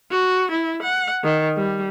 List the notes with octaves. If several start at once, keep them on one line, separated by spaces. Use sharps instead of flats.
F#4
E4
F#5
D#3
G3